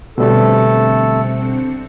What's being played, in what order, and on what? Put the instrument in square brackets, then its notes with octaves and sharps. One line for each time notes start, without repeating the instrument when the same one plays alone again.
[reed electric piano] B2 G3 [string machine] D3 C4 C#7 [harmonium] A3 A4